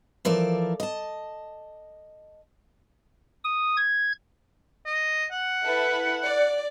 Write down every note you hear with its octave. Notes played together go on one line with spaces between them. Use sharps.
E3 F3 A4 A#4 D5
D#5 A5
D#6
G#6
D#5
F#5
E4 A4 B4
D5